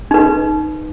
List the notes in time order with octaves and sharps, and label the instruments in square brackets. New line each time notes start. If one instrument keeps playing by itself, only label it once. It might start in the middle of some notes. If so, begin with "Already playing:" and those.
[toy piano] D#4 B4